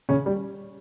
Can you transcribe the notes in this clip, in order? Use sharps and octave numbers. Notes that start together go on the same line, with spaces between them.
C#3 C#4
G3